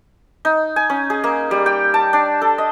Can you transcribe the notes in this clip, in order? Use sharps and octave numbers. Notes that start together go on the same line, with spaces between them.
D#4
G#5
C#4
G#4
A#3
G3
G5
A5
D4
A4
D#5